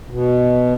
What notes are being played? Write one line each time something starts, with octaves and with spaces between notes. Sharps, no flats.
B2